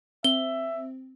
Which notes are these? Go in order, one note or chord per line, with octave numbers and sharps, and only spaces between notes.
C4 E5 G7